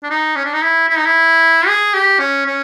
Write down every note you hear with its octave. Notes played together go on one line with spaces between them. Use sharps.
D4
D#4
C#4
D4
D#4
E4
E4
D#4
E4
G#4
G4
C#4
C#4